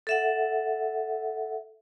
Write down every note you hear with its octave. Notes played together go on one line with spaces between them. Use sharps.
A4 E5 F#5